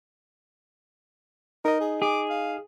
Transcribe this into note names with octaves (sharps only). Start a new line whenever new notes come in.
D#4 A#4 D#5
G#4
G#4 D6
F5